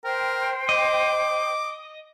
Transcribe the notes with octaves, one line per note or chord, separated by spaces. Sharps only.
A#4 C5 G5
D#5 D6